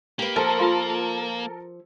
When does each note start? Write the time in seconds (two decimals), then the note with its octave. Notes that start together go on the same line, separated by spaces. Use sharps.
0.19 A#3 G4 B4
0.36 F3 A4 A#4 G5 A5
0.59 F4 F5 C6